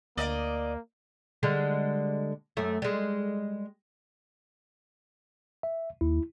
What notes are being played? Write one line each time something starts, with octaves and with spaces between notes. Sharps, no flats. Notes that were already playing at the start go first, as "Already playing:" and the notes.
D2 A#3 D5 D#5
D3 G3 G#3
F#2 A3
G3 G#3
E5
D#2 E4